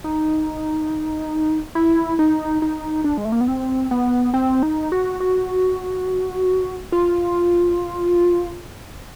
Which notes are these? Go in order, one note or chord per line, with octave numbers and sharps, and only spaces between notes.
D#4
E4
D#4
D#4
D4
G#3
A3
A#3
B3
C4
B3
C4
D#4
F#4
F#4
F4